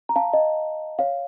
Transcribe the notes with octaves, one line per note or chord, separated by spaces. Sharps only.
A#5
F5 A5
D#5
C#5 F5